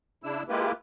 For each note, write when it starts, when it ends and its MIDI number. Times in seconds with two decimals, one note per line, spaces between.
0.24 0.43 49
0.24 0.43 62
0.24 0.43 64
0.24 0.43 88
0.49 0.72 56
0.49 0.72 58
0.49 0.72 64
0.49 0.72 65
0.49 0.72 67
0.49 0.72 71